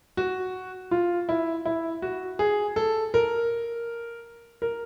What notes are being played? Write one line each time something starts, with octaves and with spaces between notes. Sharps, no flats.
F#4
F4
E4
E4
F#4
G#4
A4
A#4
A#4